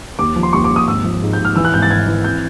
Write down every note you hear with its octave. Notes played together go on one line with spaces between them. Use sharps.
D#2 D6
F3
C6
D#2 C#6
D6
D#2
D#6
G#1 E6
F3
G#2
G6
G#2
F6
E3 E6
F#6
G#1 G6
A6
G#1 G#6
E3
C4 G6